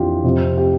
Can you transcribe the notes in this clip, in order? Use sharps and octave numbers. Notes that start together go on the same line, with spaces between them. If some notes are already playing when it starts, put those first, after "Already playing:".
Already playing: F2 E3 D4 F4 G4
F2 C3 F3
G4